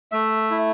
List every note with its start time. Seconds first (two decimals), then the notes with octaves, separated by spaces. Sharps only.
0.12 A3 E5
0.51 E4